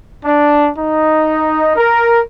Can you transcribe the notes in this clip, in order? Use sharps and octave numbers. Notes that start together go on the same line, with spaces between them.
D4
D#4
A#4